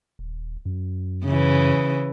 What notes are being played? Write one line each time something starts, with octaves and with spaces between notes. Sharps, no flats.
D#1
F#2
C#3 E3